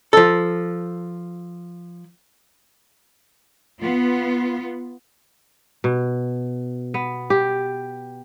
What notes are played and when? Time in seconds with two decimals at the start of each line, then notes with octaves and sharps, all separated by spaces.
0.13 F3 A4
3.80 B3 F4
5.84 B2
6.94 B3
7.30 G4